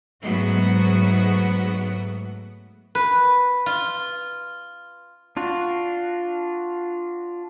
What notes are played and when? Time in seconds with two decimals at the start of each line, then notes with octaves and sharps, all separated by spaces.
0.23 G#2 F#3 A3 B3 F#4
2.95 B4
3.66 F4
5.37 D4 F4 F#4